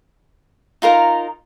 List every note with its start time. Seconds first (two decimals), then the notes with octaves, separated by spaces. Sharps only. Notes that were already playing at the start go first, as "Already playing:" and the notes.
0.82 D#4 F4 A#4 A#5